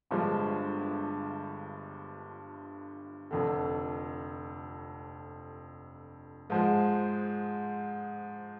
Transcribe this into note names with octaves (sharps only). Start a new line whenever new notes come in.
G1 G2 F3 G#3
F1 F2 D3
G#2 F3 G#3